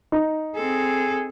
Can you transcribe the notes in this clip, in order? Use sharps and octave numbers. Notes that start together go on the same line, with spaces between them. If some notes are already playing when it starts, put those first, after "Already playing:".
D#4
C4 G#4 A4